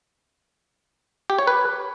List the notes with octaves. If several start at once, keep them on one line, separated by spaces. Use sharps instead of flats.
G4
C#5
B4